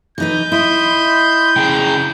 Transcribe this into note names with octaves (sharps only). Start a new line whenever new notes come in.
E3 D#4 B4 G6
E4 D#5 B5 C6
C#3 G5